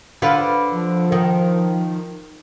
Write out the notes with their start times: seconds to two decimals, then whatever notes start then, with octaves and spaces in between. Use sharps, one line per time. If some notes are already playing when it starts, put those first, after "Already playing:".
0.22 D3 F4 B4
0.75 F3
1.12 D#3